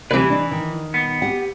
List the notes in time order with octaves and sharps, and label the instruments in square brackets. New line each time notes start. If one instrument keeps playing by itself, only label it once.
[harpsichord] D2 C3 [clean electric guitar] E3 B4
[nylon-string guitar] D4 D#4
D#3
[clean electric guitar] B3
[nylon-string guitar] G4 F#5